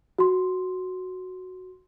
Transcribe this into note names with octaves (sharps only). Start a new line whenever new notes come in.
F#4 C6